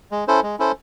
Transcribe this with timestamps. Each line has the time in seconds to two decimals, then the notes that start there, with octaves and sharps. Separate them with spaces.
0.12 G#3
0.28 C#4 E4 A4 C5
0.43 G#3
0.59 C#4 E4 A4 C5